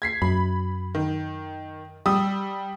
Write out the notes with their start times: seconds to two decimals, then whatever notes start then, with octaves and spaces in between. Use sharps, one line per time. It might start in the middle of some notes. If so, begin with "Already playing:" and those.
0.02 G#6 B6 C7
0.22 F#2 B5
0.95 D#3
2.06 G3 D#6 E6